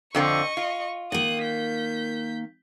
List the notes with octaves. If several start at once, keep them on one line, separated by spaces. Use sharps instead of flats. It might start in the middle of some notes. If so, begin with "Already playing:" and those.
F2 D3 C4 D#5 C#6
F4
D#3 A#3 D#6 F#6
G6 B6